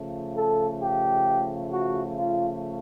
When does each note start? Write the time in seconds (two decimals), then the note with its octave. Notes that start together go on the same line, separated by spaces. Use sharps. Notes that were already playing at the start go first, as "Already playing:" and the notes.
Already playing: C#3 F3 A3
0.36 A4
0.81 G4
1.72 F#4
2.17 F4